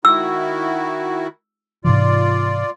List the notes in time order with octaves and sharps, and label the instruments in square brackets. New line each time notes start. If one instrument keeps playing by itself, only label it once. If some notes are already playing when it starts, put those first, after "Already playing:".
[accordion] D#3 E4 F#4 [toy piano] E6
[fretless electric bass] G#2 C3 E3 [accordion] F4 D5